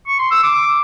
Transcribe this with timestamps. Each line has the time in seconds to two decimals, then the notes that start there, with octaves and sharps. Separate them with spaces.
0.07 C#6
0.19 C6
0.31 E6
0.43 D6